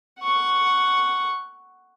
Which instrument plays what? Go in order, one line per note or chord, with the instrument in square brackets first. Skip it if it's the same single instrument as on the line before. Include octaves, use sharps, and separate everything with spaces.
[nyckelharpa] F#5 C#6